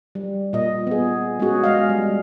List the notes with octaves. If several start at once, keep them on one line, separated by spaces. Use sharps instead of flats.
G3
A#2 D#5
B3 G#4
G#3 B3 C#4 F#4 G#4
G#3 D#5 F5
G3